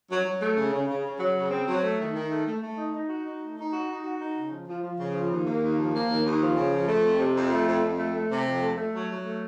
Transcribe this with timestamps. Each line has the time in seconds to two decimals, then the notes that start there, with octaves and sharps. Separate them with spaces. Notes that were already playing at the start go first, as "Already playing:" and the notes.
0.10 F#3
0.25 F#3
0.41 A3
0.56 C#3
0.72 C#3
0.88 C#3
1.04 C#3
1.20 F#3
1.36 C#3
1.51 C4
1.67 F#3
1.83 A3
1.99 D#3
2.14 D#3
2.30 A3
2.46 A3
2.62 A3
2.77 D#4
2.93 D#4
3.09 F#4
3.24 D#4
3.40 A3
3.57 D#4
3.73 F#4
3.89 D#4
4.04 F#4
4.20 D#4
4.36 C#3
4.51 F3
4.68 F3
4.83 F3
4.98 C#3
5.15 F3
5.30 D#2
5.45 A#3
5.62 D#2
5.77 F3
5.94 A#3
6.10 D#2
6.25 D#2
6.41 F3
6.56 C#3
6.72 F3
6.88 A3
7.04 F2
7.19 C3
7.36 F2
7.51 A3
7.67 F2
7.83 F2
7.98 A3
8.14 A3
8.30 C3
8.47 F2
8.62 A3
8.77 A3
8.94 F#3
9.10 F#3
9.25 A3